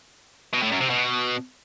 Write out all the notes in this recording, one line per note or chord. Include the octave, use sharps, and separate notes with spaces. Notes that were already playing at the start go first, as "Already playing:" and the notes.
B2
A2
F#2
C3
B2